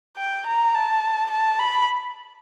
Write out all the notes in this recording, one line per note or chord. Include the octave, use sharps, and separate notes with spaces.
G5
A#5
A5
A5
B5